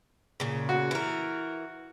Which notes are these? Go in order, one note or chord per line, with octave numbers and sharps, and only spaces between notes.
A#2 C#3
F#4
E3 A#4